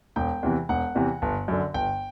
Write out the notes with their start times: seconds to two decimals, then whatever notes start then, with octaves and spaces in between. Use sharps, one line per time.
0.16 E1 G5
0.43 E2 C3 E3
0.69 E1 F#5
0.95 E2 C3 E3
1.22 G1
1.48 F#2 D3
1.74 G1 G5